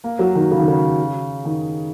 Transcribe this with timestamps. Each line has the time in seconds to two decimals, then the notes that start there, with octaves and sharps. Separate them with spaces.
0.04 A#3
0.19 F#3
0.35 D#3
0.51 C#3
0.60 D#3
0.68 C#3
1.45 D#3